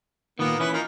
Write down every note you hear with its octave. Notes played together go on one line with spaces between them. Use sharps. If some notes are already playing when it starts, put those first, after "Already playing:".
A#2 D#3 A#3 B3
E3 C#4 E4 B4 B5
A#3 D#4 F4